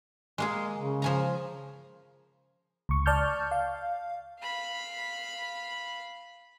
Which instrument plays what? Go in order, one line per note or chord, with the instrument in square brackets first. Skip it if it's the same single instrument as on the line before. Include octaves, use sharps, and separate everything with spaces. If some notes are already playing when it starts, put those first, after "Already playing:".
[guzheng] G#3 A#3 G#4
[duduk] C#3
[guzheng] F3 G#5 A#5
[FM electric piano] C#2 C#6
D5 A5 C#6 F6 G6
F5
[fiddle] F5 B5